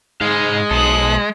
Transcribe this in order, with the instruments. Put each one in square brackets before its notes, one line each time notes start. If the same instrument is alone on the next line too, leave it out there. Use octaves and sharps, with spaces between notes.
[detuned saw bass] G#2 [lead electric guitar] G#3 [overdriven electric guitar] G#4 F5
[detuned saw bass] B1 [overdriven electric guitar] A4 C5 [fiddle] D#6 F#6